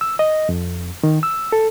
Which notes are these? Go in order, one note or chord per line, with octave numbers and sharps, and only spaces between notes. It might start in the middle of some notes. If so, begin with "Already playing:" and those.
E6
D#5
F2
D#3
E6
A4